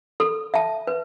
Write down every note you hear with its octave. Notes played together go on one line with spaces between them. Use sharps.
A4
E5 A5
B4